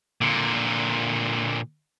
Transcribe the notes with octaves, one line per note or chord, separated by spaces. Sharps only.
A#2 D3